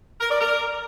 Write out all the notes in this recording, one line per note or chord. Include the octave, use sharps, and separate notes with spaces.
A#4
D5
A#4